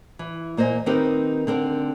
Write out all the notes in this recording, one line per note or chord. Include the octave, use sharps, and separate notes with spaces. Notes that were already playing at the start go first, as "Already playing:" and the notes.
E3
A#2 A#3 C5 D#5 G#5
D#3 C4 D#4 G4 A#4 B4
D3 C4 A#4